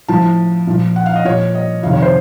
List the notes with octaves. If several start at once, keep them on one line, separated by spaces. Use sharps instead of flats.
A2 F3 A5
A#2 F3
F#5
F5
D#5
A#2 F3 C#5
D#5
F2 C3 D#3 F5
C#5
C5